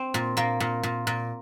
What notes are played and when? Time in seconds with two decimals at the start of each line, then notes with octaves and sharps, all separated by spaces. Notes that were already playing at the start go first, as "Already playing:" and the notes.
Already playing: C4
0.14 A#2
0.37 A#2 A#3
0.60 A#2
0.83 A#2
1.07 A#2